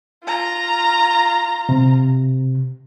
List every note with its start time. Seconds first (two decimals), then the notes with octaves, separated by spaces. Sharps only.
0.24 F4 A#5
1.69 C3